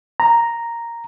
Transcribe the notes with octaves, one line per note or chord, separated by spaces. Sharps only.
A#5